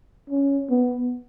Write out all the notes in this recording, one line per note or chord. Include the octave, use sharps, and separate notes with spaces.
C#4
B3